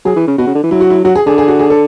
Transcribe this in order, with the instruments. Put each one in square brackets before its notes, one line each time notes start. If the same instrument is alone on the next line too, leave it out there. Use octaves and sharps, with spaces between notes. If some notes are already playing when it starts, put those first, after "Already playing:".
[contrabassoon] F#3 [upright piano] G#4
[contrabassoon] E3
C#3
[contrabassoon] B2 [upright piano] F#4
[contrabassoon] C#3
D3
E3
[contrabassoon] F#3 [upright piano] E4
[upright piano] F#4
E4
[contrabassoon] F#3 [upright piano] F#4
[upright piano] G#4
[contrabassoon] D3 [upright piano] G#4
[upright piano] G#4
F#4
G#4
A4